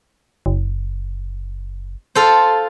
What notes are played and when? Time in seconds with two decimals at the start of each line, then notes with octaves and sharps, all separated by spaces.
0.46 F#1
2.15 F4 A4 C5